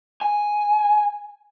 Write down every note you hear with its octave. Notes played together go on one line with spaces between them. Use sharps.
G#5